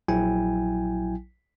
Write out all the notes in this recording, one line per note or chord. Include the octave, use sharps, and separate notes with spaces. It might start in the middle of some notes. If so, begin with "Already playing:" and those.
A#1 F#3 E4 G5 G#5